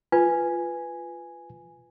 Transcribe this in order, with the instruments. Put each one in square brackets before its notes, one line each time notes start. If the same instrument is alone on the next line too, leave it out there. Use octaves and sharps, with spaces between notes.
[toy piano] F4 B4 [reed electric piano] G#5